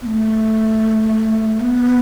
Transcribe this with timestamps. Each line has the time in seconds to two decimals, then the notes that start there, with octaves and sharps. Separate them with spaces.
0.02 B3
0.06 A3
1.60 B3